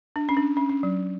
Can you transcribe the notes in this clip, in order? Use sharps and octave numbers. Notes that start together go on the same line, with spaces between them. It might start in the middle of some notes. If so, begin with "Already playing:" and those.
D4
C#4
D4
C#4
C#4
F#3